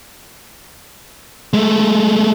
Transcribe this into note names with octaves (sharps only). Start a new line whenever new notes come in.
G#3 A3